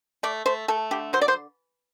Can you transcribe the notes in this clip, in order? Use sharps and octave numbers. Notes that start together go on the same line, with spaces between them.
A3 D5
A3 C5
A3 A4
D3 G4
F#3 C5
D5
C5